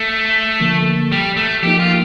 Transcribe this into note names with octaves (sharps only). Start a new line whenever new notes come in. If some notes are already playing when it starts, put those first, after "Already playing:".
Already playing: A3
D3 F3 A#3
G3
A3
F3 A#3 D#4 G4
F4